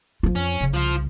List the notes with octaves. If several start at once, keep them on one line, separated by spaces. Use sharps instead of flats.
A#1 F3 F4
F2 C#4
F#1 C#3
C2 F3 F4